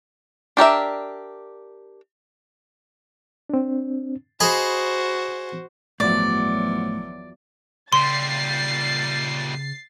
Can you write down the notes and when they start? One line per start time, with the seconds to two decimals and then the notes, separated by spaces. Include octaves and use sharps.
0.57 D4 G4 A#4 E5
3.49 C4 D4
4.40 F#4 G#4 C5 D#5 B5
6.00 G1 E2 A2 F3 F#3 D5
7.93 A#2 C#3 G3 C6 A6 C7